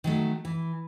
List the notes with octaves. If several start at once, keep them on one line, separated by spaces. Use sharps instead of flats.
D#3 F#3 A3
E3